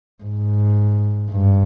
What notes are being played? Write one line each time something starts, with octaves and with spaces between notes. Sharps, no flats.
G#2
G2